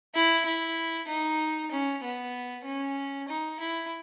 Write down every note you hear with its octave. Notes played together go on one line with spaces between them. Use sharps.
E4
E4
D#4
C#4
B3
C#4
D#4
E4